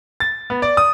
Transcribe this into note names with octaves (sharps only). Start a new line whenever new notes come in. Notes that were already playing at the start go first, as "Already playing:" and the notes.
A6
B3
D5
D#6